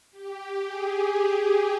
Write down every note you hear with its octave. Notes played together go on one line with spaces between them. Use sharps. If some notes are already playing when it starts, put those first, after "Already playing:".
G4
G#4